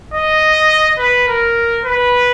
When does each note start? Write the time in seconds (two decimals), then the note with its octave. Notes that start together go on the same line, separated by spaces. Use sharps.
0.14 D#5
0.99 B4
1.28 A#4
1.85 B4